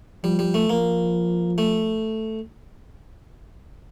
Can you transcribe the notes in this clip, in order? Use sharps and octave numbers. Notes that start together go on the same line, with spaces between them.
F3 G3
G3
A3
F3 A#3
A3